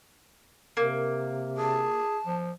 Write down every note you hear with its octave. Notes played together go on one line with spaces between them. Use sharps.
C3 A#3
G#4 A5
F3